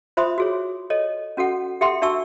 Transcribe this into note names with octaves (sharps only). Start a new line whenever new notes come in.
F4 C5 E5 B5 C6 D#6
F#4 G#4 C#5
A4 C#5 D#5
C#4 F#4 A4 F#5
G4 A4 E5 F#5 G5 C6
D4 F#4 E5 A5 C#6 E6